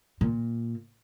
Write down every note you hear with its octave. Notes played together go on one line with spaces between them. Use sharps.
A#2